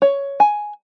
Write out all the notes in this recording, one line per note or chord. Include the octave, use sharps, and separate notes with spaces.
C#5
G#5